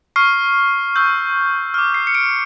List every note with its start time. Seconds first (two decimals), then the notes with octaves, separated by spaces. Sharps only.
0.16 C#6 F6 C7
0.96 C#6 E6 G6
1.74 D6 F6
1.94 C7
2.07 C#7
2.15 D7